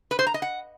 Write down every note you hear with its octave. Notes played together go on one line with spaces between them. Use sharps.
B4
C5
A#5
D#5
F#5